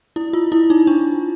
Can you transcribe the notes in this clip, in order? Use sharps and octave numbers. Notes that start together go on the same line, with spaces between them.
E4
F4
E4
D#4
D4